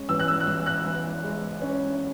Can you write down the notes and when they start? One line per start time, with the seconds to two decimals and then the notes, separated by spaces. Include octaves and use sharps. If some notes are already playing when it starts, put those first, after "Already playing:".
Already playing: G#3 C#4
0.09 E3 E6
0.20 F#6
0.28 E6
0.40 F#6
0.47 E3 E6
0.66 F#6
0.85 E3
1.24 G#3
1.62 C#4